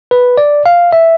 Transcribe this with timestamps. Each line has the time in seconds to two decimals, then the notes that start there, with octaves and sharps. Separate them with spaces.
0.11 B4
0.37 D5
0.66 F5
0.93 E5